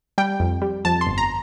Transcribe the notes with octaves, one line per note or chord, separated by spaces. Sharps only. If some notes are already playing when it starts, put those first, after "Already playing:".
G3 G5
F2
G3
F2 A5
C6
G1
A#5